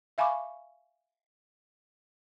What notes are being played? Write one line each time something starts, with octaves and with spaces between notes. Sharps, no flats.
E5 F5 G#5 B5 C#6 D6